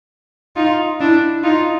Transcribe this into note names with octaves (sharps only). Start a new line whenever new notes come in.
D#4 F4
D4 E4
D#4 F4